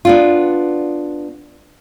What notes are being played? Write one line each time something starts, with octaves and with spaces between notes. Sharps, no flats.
B3 D4 F4